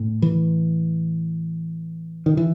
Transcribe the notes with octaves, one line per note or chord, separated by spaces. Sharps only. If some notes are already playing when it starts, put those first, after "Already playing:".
Already playing: A2
E3
D#3
E3